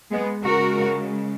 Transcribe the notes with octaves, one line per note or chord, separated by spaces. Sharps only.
G#3 B3
C#3 G#3 F#4 A#4